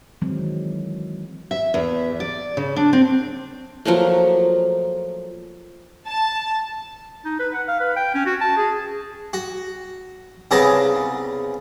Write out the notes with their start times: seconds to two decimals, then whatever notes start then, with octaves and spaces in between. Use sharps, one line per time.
0.22 D#3 E3 F#3 G#3 C4
1.51 E5
1.74 E2
2.20 D5
2.57 C#3
2.76 D4
2.93 C4
3.85 F3 F#3 A3 A#3
6.08 A5
7.25 D#4
7.39 B4
7.54 F#5
7.68 F5
7.80 B4
7.96 G5
8.15 C#4
8.26 F#4
8.41 A5
8.57 G#4
9.33 F#4
10.51 C2 C#3 B3 G#4 A5 A#5